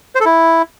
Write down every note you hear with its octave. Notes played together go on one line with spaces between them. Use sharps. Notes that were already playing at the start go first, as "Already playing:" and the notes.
C5
A4
E4